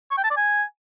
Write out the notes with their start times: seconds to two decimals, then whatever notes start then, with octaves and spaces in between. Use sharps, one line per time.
0.11 C#6
0.18 G5
0.24 A5
0.30 D5
0.37 G#5